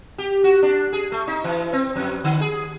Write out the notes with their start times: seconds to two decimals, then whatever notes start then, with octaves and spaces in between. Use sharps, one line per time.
0.18 G4
0.44 F#4
0.63 D4
0.93 G#4
1.12 A3
1.27 D#4
1.44 E3
1.73 C4
1.96 F2
2.24 D3
2.41 G#4